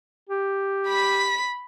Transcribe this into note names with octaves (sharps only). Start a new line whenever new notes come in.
G4
B5 B6